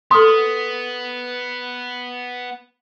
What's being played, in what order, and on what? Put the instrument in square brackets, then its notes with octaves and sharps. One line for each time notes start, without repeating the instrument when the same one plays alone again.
[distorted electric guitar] B3 [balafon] A4 B5 [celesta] C6 D#6